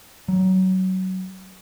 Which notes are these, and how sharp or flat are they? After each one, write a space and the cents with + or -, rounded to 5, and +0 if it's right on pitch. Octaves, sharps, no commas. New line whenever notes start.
F#3 +20